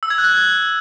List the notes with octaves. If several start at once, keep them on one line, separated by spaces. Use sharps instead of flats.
E6
G#6
F#6